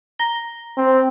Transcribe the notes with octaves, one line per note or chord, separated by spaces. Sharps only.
A#5 A#6 G7
C4